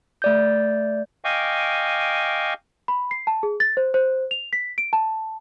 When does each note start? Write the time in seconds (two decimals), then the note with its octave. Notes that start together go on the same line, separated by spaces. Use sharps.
0.22 A3 D5 G6
1.24 D#5 F5 G5 G#5 C#6 D6
2.88 B5
3.11 C7
3.27 A5
3.43 G#4
3.60 A6
3.77 C5
3.94 C5
4.31 F7
4.53 B6
4.78 D7
4.93 A5